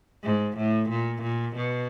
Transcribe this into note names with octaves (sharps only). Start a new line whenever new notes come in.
G#2
A2
A#2
A#2
B2